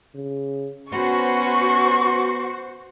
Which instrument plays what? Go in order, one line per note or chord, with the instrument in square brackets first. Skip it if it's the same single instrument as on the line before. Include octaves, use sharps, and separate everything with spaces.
[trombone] C#3
[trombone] B3 [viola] C#4 B5 [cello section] F#4 C5 [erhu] C#6